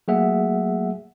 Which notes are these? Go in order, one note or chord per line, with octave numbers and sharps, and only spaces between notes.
F#3 A3 A#3 G#4 E5 F#5